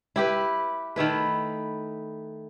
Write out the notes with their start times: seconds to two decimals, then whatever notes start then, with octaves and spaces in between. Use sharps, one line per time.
0.16 E4 G4 B4
0.96 D#3 A3 E4 B4